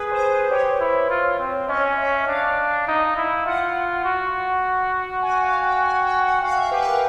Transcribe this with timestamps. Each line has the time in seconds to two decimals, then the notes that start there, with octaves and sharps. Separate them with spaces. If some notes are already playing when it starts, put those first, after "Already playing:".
Already playing: G#4 B4
0.12 C5
0.30 B4
0.50 G4 C#5
0.81 E4
1.10 F4
1.39 C4
1.68 C#4 D#5
1.98 E5
2.27 D4 F5
2.88 D#4
3.17 E4
3.46 F4 F#5
4.05 F#4
5.23 G#5
5.36 F#5
5.43 F5
5.62 G5
5.82 G#5
6.02 G5
6.22 F#5
6.42 F#4 F5
6.57 E5
6.71 G4 B4
6.82 B4
6.87 A#4